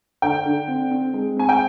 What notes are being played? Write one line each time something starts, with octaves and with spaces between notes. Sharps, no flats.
D3 G5
D3
C4
C4
G#3
C4 G#5
G5